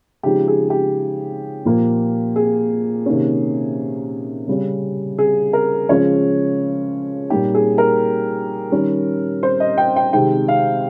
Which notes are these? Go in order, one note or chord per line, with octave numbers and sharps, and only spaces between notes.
C#3 F3 G#3 D#4 G4
G#4
G4
A#2 F3 A#3
G#4
C3 D#3 A#3 C#4
C#3 G3 C#4
G#4
A#4
C#3 F3 G#3 C#4 C#5
A#2 G3 A#3 D#4 G4
G#4
A#4
D#3 G3 C#4
C5
D#5
G5
G5
C3 D#3 G#3 G5
F5